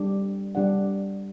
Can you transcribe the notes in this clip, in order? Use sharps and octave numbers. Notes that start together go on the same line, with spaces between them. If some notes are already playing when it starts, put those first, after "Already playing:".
Already playing: G3 D4 G4
G3 D4 G4 D5 F#5